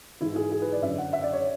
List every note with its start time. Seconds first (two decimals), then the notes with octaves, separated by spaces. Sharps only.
0.21 G#2 E3 E4
0.36 G#4
0.52 G#4
0.62 B4
0.72 D5
0.82 F#2 E5
0.86 D3
0.98 F#5
1.13 E5
1.23 D5
1.33 C#5